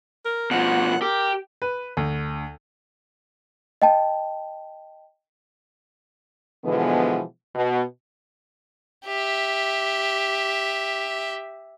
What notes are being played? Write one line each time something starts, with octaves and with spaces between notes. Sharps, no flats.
A#4
B2 F3 F#5
G4 A#4
B4
D2
D#5 G5 A5
B2 D3 E3 F3 G#3 B3
B2
G4 E5